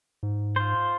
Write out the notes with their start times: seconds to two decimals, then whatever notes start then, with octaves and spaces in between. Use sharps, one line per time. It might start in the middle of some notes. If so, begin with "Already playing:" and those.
0.23 G#2
0.56 F4 C5